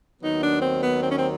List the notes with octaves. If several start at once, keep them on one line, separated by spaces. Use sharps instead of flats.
D#2 D#3 F#3 B3 D#4
D4
C4
B3
C4
C#4
C4